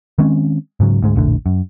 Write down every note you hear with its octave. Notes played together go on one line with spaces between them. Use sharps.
D#3 G#3 C4 C#4
G#2 C#3 F#3
D2 G#2 G#3
F1 A#1 A2 D3
F#2